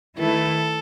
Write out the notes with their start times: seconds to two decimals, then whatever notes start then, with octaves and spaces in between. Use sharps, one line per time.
0.18 D#3 A3 E4 A4 B4